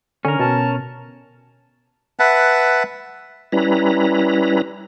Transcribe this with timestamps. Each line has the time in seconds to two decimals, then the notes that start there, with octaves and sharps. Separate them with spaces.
0.25 D3 C#4 A#4
0.40 B2 A5
2.19 B4 E5 F#5 A5
3.52 G3 C#4 E4 B4 A#5